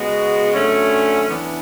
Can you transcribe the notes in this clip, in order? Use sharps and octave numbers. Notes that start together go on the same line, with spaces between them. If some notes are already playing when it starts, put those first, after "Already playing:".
Already playing: C#3 G#3 B3 F#4
F#2 D3 A3 C#4
E3 B3 D4